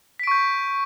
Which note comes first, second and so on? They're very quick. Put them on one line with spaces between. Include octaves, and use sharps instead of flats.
B6 D7 C#6 G6